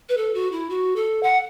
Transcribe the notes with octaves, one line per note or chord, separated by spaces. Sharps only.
B4
A4
F#4
E4
F#4
A4
F#5